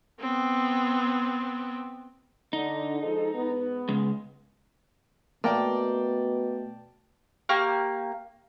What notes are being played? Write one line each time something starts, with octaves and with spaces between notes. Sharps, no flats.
B3 C4
D3 D#4
F3 G#3 A4
G#2 B3
C#3 G#3
B2 A3 A#3 D5 G5 A5
A#3 G4 C#6 F6